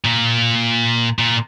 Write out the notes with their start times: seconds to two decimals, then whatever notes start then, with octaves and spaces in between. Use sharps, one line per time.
0.05 A#2
1.19 A#2